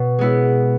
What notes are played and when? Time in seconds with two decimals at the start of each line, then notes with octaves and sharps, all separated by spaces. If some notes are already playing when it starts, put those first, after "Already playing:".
Already playing: B2
0.19 G#3 B3 E4